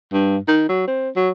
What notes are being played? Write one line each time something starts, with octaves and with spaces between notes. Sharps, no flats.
G2
D#3
F#3
C4
F#3